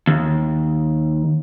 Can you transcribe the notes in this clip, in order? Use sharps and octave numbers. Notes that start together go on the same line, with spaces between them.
D#2